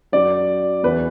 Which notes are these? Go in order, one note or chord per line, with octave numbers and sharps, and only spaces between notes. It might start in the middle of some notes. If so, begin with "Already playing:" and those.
F#2 F#3 D5
E2 E3 B4